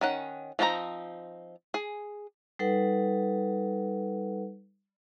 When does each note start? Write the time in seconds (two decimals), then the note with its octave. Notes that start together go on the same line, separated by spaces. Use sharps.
0.01 D#3 C#4 F#5
0.59 F3 C4 D#4 F#4 A#5
1.74 G#4
2.59 G3 D#4 A4 B4 F#5